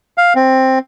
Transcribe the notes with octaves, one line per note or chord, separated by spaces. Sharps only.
F5
C4